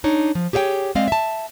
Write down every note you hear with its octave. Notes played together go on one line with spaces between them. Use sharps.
D4 D#4 C#5
F3
G4 G#4 C#5 F5 G5
G#3 C4 D5 D#5 F5
E5 A5